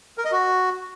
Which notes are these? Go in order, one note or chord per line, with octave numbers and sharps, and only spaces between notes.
A#4
D#5
F#4